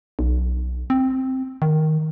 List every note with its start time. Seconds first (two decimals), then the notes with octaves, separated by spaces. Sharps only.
0.19 B1
0.90 C4
1.62 D#3